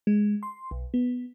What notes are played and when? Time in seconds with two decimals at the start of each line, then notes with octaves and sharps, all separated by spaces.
0.07 G#3
0.43 C6
0.71 B1
0.94 B3